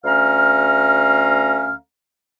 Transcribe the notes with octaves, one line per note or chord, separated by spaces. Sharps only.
D2 A3 C#4 F5 A#5 F6